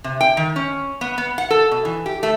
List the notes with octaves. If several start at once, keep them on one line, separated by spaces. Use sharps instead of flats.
C3
G5
D#3
C#4
B3
B3
F#5
A4
B2
E3
G4
A3